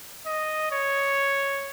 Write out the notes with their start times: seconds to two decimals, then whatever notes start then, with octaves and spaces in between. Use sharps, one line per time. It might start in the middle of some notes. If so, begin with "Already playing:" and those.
0.26 D#5
0.72 C#5